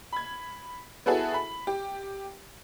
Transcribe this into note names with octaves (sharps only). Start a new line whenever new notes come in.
B5 G#6
B3 E4 F#4 G#4 A4
B5
G4